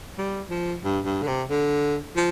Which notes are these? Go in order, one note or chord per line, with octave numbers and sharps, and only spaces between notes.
G3
F3
G2
G2
D3
C3
D3
F3